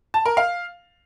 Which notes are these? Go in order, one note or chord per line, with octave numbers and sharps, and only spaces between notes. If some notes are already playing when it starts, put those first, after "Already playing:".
A5
A#4
F5